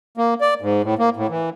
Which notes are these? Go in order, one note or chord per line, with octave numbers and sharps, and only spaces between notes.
A#3
D5
G#2
A2
A#3
A2
E3